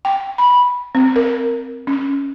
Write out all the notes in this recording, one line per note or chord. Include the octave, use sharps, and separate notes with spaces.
G5
B5
C4
A#4
C#4